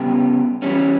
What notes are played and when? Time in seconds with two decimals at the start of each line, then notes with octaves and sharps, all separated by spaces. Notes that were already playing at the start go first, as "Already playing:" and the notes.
Already playing: C#3 G3 B3 G4
0.62 E3 G3 C#4